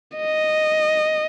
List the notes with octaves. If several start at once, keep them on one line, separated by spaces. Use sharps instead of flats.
D#5